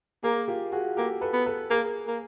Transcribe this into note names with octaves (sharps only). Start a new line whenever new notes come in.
A#3 G#4 A#4
F4 G4
F#4 G#4
A#3 G4 A4
A4 B4
B3
A4 B4
A#3 G#4 A#4
A#3